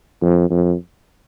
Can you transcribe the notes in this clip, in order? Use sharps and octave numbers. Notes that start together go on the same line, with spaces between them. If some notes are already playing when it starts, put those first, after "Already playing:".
F2
F2